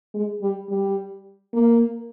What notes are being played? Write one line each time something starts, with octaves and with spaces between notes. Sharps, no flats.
G#3
G3
G3
A#3